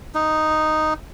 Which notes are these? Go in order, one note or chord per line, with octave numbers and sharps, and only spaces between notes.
D#4